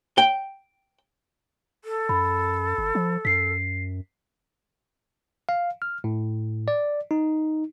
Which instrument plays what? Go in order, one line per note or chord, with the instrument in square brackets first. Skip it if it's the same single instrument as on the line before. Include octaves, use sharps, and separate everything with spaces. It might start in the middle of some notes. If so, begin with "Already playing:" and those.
[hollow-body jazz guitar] G5
[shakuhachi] A4
[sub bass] F#2 [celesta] B5
[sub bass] G1
F3
[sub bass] F#2 [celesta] B6 C7
[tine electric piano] F5
F6
A2
D5
D#4